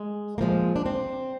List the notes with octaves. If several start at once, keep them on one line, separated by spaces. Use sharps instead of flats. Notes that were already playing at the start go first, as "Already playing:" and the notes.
Already playing: G#3
A#2 F3 G#3 A#3
D4
C4